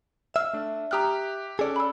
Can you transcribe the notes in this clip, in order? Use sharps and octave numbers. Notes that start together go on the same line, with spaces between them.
E5 E6 F6
A3 D4
G4 G5 A#5 D#6 F6 F#6
C#4 G#4 A4 D5
B5 E6